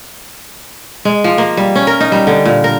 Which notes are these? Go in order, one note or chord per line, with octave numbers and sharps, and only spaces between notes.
G#3
F3
A#3
G3
C#4
A#4
D#4
G3
D3
A#2
A#4